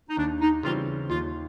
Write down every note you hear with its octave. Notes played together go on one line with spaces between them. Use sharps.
D#4
D#2 D4
D#4
C#3 E3 G3 C4 F4
D#2 F4